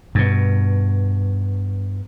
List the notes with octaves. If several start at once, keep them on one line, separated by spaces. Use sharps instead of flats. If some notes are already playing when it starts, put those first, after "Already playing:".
G2 B2